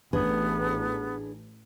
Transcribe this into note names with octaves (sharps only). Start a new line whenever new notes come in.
A1 B3 D4 G#4 B4